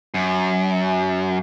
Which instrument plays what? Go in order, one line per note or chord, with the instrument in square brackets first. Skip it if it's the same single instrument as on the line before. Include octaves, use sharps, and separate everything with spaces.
[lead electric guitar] F#2